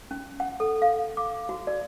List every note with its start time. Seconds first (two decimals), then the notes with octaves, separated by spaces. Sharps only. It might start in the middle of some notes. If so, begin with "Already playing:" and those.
0.11 C#4
0.40 F#5
0.60 A4
0.82 F5
1.17 D6
1.49 F#4
1.67 D5